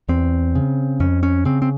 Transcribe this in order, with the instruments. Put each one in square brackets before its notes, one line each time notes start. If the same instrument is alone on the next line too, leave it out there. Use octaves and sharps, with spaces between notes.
[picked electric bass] E2 C4
C#3
F2 C#4
C#4
C#3 C4
C4